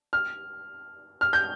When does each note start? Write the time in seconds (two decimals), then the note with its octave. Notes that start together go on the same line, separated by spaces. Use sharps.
0.13 F6
1.21 F6
1.33 G6